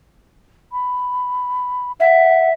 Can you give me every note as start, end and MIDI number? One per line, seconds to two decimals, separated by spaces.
0.72 1.92 83
2.00 2.53 76
2.00 2.49 78